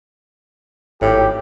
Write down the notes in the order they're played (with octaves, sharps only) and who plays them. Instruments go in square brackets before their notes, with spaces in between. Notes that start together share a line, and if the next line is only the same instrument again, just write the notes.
[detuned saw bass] G#1 [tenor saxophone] A2 [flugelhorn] G4